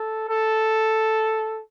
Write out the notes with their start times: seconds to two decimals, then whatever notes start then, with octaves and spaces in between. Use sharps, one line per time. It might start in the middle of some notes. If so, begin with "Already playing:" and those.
Already playing: A4
0.29 A4